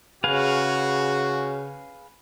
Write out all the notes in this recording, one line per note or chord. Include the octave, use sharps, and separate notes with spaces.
C#3 F#4 G#4 B4 F5